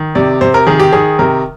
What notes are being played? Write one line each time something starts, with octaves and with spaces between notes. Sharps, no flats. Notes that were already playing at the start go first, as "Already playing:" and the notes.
Already playing: D#3
C3 D5
C3 C5
A#4
D#3 G#4
G4
D#3 G#4
C3 A#4